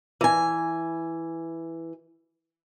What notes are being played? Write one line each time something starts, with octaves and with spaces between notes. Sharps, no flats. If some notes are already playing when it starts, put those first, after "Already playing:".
E3 G#5